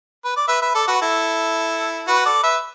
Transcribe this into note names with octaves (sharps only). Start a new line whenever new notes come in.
B4
D5
B4 E5
B4 E5
A4 D5
F#4 B4
E4 A4
F#4 B4
A4 D5
B4 E5